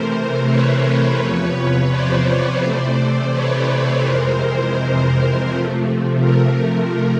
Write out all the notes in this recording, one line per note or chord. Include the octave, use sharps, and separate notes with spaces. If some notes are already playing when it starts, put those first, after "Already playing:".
Already playing: C3 E3 A3 A#4 C5
B4 C#5
E2 C3 F3 B4 C#5
C5 D5
C3 E3 A3
B4 C#5
F2 C3 E3 G#3 A#4 C5
C3 F3 A3
A#4